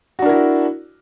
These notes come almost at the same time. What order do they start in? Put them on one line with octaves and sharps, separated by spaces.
F#4 D4 A#4 E4